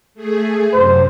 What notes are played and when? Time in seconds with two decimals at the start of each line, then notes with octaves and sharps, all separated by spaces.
0.14 A3 G#4
0.73 F#2 C3 C5